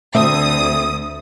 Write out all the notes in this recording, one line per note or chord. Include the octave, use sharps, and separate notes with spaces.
D2 A3 C4 E5 D#6